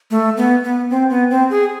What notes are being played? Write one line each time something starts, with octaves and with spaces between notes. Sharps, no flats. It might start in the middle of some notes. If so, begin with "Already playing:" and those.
A3
B3
B3
C4
B3
C4
G#4